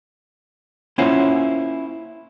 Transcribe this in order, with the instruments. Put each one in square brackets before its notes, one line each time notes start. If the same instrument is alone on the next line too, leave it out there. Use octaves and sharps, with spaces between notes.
[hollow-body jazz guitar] A#3 C#4 E4 F4 C5 F#5